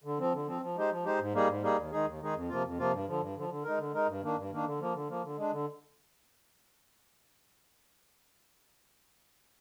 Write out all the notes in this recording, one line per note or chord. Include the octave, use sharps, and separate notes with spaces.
D3
F3 C4
D3
F3 C4
F3
G#3 D#4 G4 C5
F3
G#3 D#4 G4 C5
G#2
G3 A#3 D#4 G#4
G#2
G3 A#3 D#4 G#4
D#2
D#3 G#3 D#4 G#4
D#2
D#3 G#3 D#4 G#4
F2
C3 F3 A#3 F4
F2
C3 F3 A#3 F4
G2
D3 F3
G2
D3 F3
D3
G#3 D#4 A#4
D3
G#3 D#4 A#4
G2
D#3 A#3 D4
G2
D#3 A#3 D4
D3
F3 A#3
D3
F3 A#3
D3
G#3 D4
D3